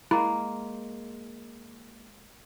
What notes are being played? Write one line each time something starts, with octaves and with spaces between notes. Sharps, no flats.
G#3 A#3 E4